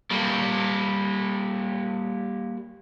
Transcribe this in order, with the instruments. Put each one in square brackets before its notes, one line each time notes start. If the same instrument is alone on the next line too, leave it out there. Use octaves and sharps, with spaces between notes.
[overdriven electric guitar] G3 A#3